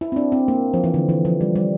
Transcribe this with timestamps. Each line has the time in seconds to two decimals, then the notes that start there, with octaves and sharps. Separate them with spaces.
0.01 E4
0.12 C4
0.16 D4
0.32 C4
0.48 A#3
0.74 F3
0.84 E3
0.94 D3
1.09 E3
1.25 F3
1.41 G3
1.56 G3